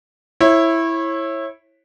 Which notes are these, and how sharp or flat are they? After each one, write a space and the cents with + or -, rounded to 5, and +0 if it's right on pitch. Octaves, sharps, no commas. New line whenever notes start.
E4 +0 C#5 -30